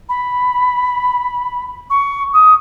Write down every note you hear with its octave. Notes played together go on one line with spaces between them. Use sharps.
B5
C#6
D#6